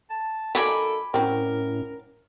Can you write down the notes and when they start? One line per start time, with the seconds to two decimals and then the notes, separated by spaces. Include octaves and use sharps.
0.10 A5
0.55 F#3 A#3 D#4 A4 D5 G#5 B5
1.14 A2 F#3 C4 C#4 E4 A#4